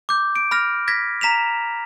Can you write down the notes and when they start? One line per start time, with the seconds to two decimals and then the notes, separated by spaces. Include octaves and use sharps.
0.09 D6 G6
0.36 D7
0.51 B5 F6 A#6
0.88 G#6 A#6 B6
1.21 A#5 B6 E7 F7